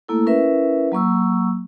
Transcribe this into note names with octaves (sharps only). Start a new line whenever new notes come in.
A3 A#3 E4 A4
C#4 E4 A#4 B4 E5
F#3 A#3 C#6 E6